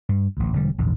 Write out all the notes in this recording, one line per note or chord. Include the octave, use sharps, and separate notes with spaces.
G2
A1 D2
E1 D3 G3
A#1 E2 G#2 D3